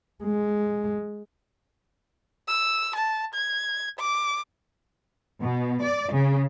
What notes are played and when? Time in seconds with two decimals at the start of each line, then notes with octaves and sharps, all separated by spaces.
0.24 G#3
2.48 E6
2.96 A5
3.34 G#6
3.99 D6
5.41 B2
5.82 D5
6.13 C#3